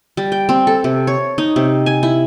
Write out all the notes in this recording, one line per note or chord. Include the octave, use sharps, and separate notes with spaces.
G3
G5
C4
A4
C3
C#5
D#4
C3
G#5
E4